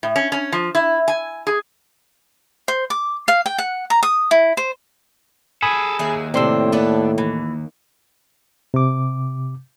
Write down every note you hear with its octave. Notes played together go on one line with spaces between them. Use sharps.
A2
C#4
C#4
F3
E4
G#5
G#4
C5
D6
F5
G5
F#5
A#5
D#6
E4
C5
G#4 A4 G#5 B5 D#6
D#2 G#4 E5
A2 C3 C4 D4 C6 E6
A#3 B3 D4 A4
E3
C3 D6